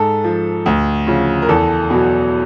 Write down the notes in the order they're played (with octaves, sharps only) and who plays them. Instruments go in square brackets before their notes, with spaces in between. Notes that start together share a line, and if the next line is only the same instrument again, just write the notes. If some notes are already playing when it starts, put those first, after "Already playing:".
Already playing: [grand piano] G#2 A4
F3
D2
C#3 F3
A#4
E2 A4
B2 F#3